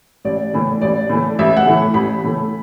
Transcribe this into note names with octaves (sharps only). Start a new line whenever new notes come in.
A1 D5
A2 E3 A3
A1 D5
A2 E3 A3
A1 E5
F#5
A2 E3 A3
A1 B5
A2 E3 A3